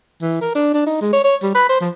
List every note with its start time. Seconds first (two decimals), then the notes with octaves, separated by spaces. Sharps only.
0.22 E3
0.41 A#4
0.55 D4
0.74 D4
0.86 D#4
1.01 G#3
1.13 C#5
1.24 C#5
1.42 G3
1.55 B4
1.69 C5
1.81 F3